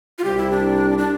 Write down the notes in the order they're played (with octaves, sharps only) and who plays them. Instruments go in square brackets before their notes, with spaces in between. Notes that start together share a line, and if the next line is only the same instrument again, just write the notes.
[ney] F4
[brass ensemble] C2 C3 G3 [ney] G4
[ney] E4
D4
D4